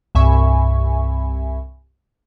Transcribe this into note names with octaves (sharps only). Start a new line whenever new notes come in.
C2 G2 E5 G#5 B5 C#6